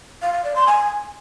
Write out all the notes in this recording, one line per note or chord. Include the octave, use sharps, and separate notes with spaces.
F5
F5
D5
C6
G#5